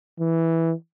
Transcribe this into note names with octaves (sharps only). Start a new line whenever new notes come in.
E3